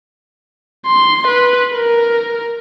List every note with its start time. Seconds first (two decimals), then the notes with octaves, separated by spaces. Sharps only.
0.87 C6
1.27 B4
1.74 A#4